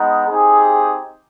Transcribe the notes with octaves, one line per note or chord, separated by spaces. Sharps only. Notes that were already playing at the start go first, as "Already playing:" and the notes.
Already playing: G#3 B3 D#4
C4 D#4 G4 G#4